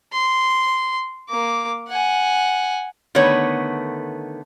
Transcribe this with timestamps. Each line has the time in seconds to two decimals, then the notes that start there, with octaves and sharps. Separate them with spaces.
0.12 C6
1.29 A#3 D6
1.88 F#5 G#5
3.15 D3 D#3 A3 B3 C#5